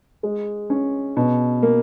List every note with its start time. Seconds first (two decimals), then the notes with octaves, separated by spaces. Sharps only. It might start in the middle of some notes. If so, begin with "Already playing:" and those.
0.23 G#3
0.70 C#4
1.17 B2
1.63 A#3